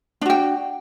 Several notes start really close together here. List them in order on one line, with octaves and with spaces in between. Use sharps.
D4 F#4 G5